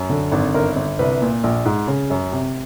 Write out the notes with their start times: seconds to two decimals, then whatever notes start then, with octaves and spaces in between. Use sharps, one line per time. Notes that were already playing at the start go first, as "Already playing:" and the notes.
Already playing: F#2
0.10 D3
0.32 G#1
0.55 G1 A#4
0.76 G1
0.99 C2 B4
1.22 A#2
1.44 A#1
1.65 G#2
1.87 C#3
2.10 F#2
2.32 C3